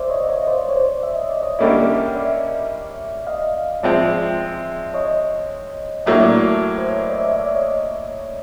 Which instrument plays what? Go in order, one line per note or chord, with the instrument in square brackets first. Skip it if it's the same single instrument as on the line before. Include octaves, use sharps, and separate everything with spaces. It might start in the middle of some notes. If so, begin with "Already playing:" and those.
Already playing: [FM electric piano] C5 D5 E5 F5
C#5 D#5
C#5 D#5
C5 D5
C#5
C5 D5
E5
D#5
D5
C#5 D#5
[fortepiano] D3 G3 A#3 C#4 E4
[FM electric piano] D5 E5
D#5 F5
[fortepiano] F3 G#3 C4 [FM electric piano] D5 E5
[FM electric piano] C#5 D#5
[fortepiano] A2 F#3 A#3 D4 [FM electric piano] D5 E5
[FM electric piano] C5
C#5
D5
D#5
D5 E5
D5 E5
C#5 D#5